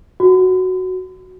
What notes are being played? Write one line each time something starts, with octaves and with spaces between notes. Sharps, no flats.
F#4